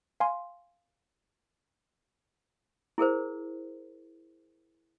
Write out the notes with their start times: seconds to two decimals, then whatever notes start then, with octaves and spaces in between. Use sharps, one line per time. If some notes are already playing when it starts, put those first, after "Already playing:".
0.20 F5 G#5 C6
2.98 E4 G#4 A#4 C5